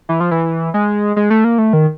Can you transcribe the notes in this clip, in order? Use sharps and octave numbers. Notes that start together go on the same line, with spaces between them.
E3
F3
E3
G#3
G#3
A3
A#3
A3
D#3